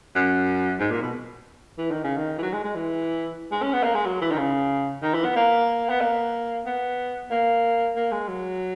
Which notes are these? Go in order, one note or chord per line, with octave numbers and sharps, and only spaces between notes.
F#2
G#2
A#2
B2
E3
D#3
C#3
D#3
E3
F#3
G#3
G#3
E3
G#3
C#4
B3
A#3
G#3
F#3
E3
D#3
C#3
D#3
E3
B3
A#3
B3
A#3
B3
A#3
A#3
G#3
F#3